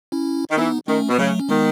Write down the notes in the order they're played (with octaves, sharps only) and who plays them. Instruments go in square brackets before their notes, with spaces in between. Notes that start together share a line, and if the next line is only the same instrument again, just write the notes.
[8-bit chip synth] C#4 E4
[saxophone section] D#3
[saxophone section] E3 [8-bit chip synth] B3 D#4
[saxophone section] D#3 [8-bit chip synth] A3 C#4
[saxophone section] B2 [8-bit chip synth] B3
[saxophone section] C#3 [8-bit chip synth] F#3 A3
[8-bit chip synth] C#4
[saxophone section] D#3 [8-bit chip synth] G#3 B3